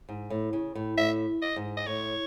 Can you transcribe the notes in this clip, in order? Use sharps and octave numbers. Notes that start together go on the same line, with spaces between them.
G#2
A2
C#3
A2
A2 E5
D#5
G#2
D#5
A2 C#5